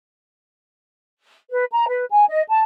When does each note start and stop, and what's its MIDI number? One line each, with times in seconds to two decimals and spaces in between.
1.50 1.64 71
1.71 1.85 82
1.88 2.04 71
2.09 2.25 80
2.29 2.41 75
2.49 2.61 81